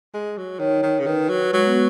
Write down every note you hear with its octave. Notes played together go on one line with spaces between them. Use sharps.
G#3
F#3
D#3 C#5
D#3
C#3
D#3 B4
F#3
F#3 G#3
B3